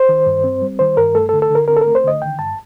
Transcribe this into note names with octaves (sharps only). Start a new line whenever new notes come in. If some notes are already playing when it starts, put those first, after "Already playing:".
Already playing: C5
D#3
G2
C4
G3
D#3 C5
G2 A#4
A3 A4
A4
D3
A4
D3
A#4
C4 A#4
A4
A3 A#4
C5
D3 D#5
D#3 G5
G2 A5